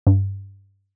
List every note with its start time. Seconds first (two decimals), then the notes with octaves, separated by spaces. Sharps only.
0.07 G2